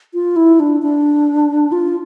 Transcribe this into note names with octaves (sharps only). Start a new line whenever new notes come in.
F4
E4
D4
D4
F4